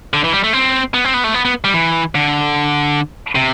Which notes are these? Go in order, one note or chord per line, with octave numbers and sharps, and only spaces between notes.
D3
E3
G3
A3
C4
B3
C4
B3
A3
B3
B3
G3
E3
D3
C3